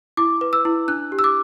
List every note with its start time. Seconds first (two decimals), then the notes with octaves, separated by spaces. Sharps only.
0.17 E4 D6
0.41 B4
0.53 E6
0.65 E4
0.88 D4 F#6
1.12 G4
1.19 E6
1.24 D6